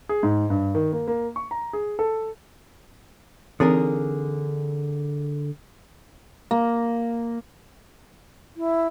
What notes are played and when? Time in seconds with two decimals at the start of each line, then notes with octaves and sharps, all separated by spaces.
0.09 G#4
0.23 G#2
0.50 G2
0.75 D#3
0.92 A#3
1.08 A#3
1.36 C#6
1.51 A#5
1.73 G#4
1.99 A4
3.60 D3 E3 C4 D#4 G#4 A#4
6.51 A#3
8.56 E4